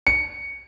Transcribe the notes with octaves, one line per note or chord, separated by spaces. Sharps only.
C#7